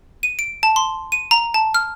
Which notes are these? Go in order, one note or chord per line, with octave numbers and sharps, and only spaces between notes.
D#7
D7
A5
C6
D#7
A#5
A5
F6